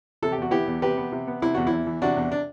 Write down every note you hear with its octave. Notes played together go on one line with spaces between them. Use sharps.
C3 A4
G4
E2 F#4
B3 E4 G4
E2
C3 G4 B4
B3
C3
B3
C3 E4
E2 F#4
E4
E2
E3
C3 D4 F#4
E2
D4